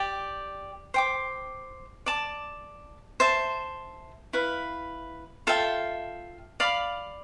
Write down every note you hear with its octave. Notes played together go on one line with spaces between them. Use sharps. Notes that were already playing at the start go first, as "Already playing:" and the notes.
Already playing: G4 D5 G5
C5 G5 D6
D5 A5 D6
C5 E5 A5
E4 B4 F5
F4 A4 E5 G5
D5 F5 B5 D6